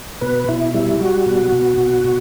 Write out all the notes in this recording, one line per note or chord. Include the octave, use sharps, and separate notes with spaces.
B2 B4
B2 E4
G3 E4
G3 F#4
B2
B2
B2
B2